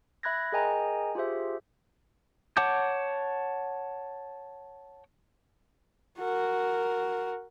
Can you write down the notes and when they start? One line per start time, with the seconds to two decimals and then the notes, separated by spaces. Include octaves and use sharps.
0.23 E5 B5 F#6 G#6 A#6
0.52 G#4 A#4 D#5 G5 G#5 A#5
1.15 F4 G4 G#4 C5 E5
2.57 C#5 F#5 A5 D6 G6
6.19 F#4 A#4